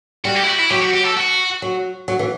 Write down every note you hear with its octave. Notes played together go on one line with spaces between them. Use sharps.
G3 F#4
G4
E4
F#4
E4
F#3 G4
F#4
G4
A4
F#4
F#3
F#3
E3